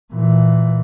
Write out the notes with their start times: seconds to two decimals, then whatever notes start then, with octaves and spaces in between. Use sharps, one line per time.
0.14 A#2 E3